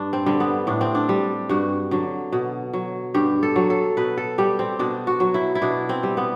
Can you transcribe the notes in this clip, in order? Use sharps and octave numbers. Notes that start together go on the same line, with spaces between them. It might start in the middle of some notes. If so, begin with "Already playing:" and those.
Already playing: G2 D4
C4
D3 G3
B3
A2 D4
C4
D4
G3
G2 F#4
D3 F#3
B2
F#3
G2 G4
A4
F#3
A4
B2 B4
A4
G3 G4
C4
B2 D4
F#4
F#3
E4
E4
B2 D4
C4
G3
B3